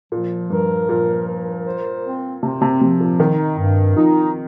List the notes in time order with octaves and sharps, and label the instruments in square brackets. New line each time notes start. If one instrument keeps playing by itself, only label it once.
[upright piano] A#2 [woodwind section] F3
[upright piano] G2 [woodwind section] A#4
[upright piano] A#2 [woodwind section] F3
[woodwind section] A#4
C5
C4
[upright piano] C3 [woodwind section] C4
[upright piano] C3
[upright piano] C3 [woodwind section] F3
[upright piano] A#2
[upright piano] D#3 [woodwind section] D#4
[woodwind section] G2
[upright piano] F3 [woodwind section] D#4